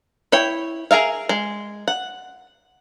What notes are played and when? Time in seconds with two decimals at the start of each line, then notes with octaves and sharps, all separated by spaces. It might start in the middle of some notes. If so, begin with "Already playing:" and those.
0.32 E4 C#5 G5
0.91 G#4 A#4 E5 F5
1.29 G#3
1.88 F#5